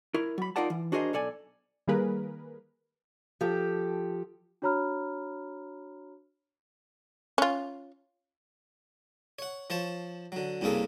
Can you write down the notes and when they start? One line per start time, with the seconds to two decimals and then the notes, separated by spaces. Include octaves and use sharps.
0.14 E4 A#4
0.38 F#3 B5
0.56 D#4 F4 A#4 D5 F#5 A5
0.70 E3
0.92 D4 F#4 G#4 A#4 C5 D#5
1.13 B1 A4 D5 G#5
1.88 D#3 G3 A#3 G#4 A#4 B4
3.41 F3 G4 A4
4.62 D4 F#4 C#5 A#5 B5 F6
7.38 C#4 F4
9.39 C#5 F#5
9.70 F3 C5 C#5 A5
10.32 D3 F#3
10.61 C2 G2 C#3 A#3 G#4 A4